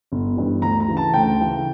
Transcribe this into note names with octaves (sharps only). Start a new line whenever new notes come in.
G1
G2 E3
D2 A#5
A#5
C#3 E3
A5
D2 G5
C#3 E3